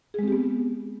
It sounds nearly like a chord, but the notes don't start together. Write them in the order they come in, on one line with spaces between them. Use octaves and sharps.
G#4 G#3 C4 G4 B3